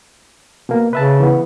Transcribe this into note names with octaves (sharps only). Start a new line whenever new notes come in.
B2 A#3
C#3 B4 E5 A5
E3 B3